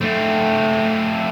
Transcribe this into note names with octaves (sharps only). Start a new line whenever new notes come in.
A3 C4